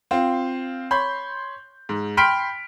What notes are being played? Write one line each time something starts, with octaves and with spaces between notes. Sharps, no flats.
C4 F4
C#5 B5 C6 G6
G#2
G5 B5 C6 F6 B6 D7